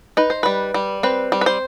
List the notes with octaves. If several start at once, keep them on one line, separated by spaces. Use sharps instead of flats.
D#4 B4
C5
G3 B4
G3
C4 B4
G3
B4
C5